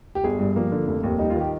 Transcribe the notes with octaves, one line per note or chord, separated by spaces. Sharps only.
G4
G1 G#4
G2
F3 A#3
D3
F1
D#2
G3 D#4
F4
D#3 G4